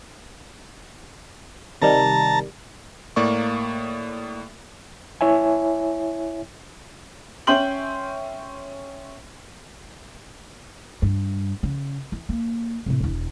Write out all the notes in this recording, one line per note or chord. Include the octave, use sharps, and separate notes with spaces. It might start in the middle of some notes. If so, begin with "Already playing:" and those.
C3 D#3 G3 A5 A#5
A2 A#3 D5 C#6
E4 C#5 E5 G#5
C#4 E5 G5 C6 G6 F#7
G2
C#3
E3
A#3
A2 C3
E1 E2